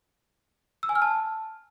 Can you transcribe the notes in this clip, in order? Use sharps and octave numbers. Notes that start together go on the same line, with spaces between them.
E6
G#5
F6
A5